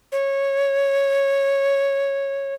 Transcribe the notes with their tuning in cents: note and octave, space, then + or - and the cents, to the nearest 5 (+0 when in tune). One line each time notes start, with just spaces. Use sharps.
C#5 -5